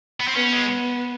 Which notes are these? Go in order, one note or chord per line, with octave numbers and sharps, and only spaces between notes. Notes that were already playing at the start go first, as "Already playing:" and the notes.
B3
C4
B3 C#4
G#3